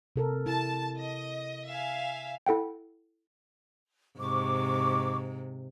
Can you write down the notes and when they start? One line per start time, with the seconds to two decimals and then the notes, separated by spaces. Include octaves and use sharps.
0.16 C3 A4 A#4
0.46 E4 A5
0.97 D#5
1.66 E5 F5 G#5
2.46 E4 A4 F#5 G5
4.19 G#2 C3 C#6 D6